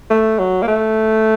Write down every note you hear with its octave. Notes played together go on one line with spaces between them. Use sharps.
A3
F#3
A#3
A3